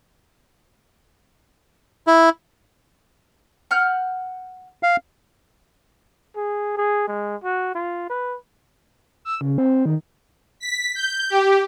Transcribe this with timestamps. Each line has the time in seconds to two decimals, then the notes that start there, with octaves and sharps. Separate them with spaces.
2.07 E4
3.71 F#5 F6 G6
4.83 F5
6.36 G#4
6.77 G#4
7.08 G#3
7.44 F#4
7.75 F4
8.10 B4
9.25 E6
9.41 C#3
9.58 C4
9.86 D#3
10.60 B6
10.95 G6
11.30 G4